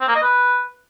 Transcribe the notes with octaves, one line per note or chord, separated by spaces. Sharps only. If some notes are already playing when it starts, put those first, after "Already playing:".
C4
A#3
D#5
B4